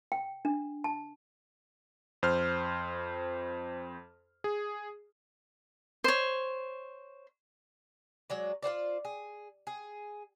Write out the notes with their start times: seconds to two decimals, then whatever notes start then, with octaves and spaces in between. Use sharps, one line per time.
0.12 G5
0.45 D4
0.84 A5
2.23 F2 C5 C6 F6
4.44 G#4
6.04 C5 C#5
8.30 F#3 G#3 D5
8.63 F4 F#4 C5 D5
9.05 G#4
9.67 G#4